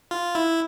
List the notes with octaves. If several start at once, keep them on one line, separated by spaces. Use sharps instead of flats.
F4
E4